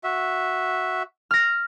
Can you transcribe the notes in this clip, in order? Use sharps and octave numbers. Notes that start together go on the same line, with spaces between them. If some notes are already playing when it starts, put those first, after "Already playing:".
F#4 E5
F6 A#6